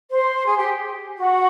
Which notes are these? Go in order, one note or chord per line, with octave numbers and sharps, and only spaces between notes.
C5
G#4
G4
F#4